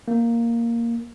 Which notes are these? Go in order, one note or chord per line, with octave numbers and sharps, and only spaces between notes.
A#3